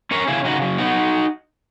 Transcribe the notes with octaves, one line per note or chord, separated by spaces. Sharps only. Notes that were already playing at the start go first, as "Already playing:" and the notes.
C#4 A#4 C#5
C#3 E4 G#4
C#3 D#4 F#4
F#3
B3 D#4 F#4